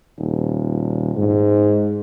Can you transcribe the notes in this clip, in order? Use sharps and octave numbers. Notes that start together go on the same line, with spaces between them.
D#1
G#2